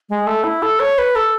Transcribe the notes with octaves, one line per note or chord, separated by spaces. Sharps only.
G#3
A3
E4
A4
C#5
B4
A4